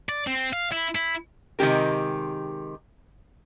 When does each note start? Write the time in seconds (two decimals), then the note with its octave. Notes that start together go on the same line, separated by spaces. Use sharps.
0.09 D5
0.27 C4
0.53 F5
0.72 E4
0.95 E4
1.59 C3 D#3 G#3 G4 A#4